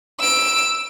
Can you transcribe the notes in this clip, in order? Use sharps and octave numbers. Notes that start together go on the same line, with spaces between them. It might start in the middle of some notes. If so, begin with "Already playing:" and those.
E6 D7